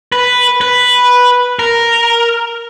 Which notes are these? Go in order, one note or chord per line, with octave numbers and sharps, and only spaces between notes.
B4
B4
A#4